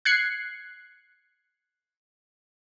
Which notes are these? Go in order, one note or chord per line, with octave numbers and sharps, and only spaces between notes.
F#6 G#6 C7 C#7